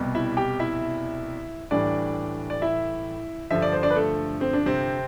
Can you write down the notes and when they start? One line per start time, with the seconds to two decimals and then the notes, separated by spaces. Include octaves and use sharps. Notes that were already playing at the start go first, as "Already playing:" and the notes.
Already playing: C2 B2 G3
0.15 E4 E5
0.37 G4 G5
0.60 E4 E5
1.71 A2 E3 G3 D4 D5
2.50 D5
2.62 E4 E5
3.50 G2 D3 F3 E5
3.62 D5
3.73 C5
3.83 D4 D5
3.90 B4
3.96 A3 A4
4.41 C4
4.53 D4
4.66 C3 C4